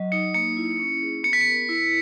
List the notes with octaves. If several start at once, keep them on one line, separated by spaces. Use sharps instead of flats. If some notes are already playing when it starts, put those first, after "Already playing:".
Already playing: F#3 D#5
D#4 C#7
A#3 C#7
E4
C#4
G#4
B3 C#7
B6
C#7
A#4
E4